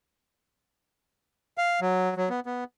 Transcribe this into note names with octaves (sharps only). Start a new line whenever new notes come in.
F5
F#3
F#3
B3
B3